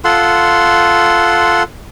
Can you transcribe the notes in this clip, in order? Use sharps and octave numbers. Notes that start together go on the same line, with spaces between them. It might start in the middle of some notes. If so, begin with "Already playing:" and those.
F4 A4 F#5 C6